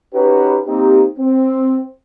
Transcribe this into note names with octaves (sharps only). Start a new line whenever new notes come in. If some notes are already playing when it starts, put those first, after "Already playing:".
C#4 D#4 F#4 G4 B4
A#3 C4 D#4 G4
C4